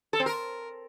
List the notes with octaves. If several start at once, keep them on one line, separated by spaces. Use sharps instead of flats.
A4
C4
A#4